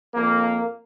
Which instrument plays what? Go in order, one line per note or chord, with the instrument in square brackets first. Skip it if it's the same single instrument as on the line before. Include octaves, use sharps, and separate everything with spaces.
[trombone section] F2 A#3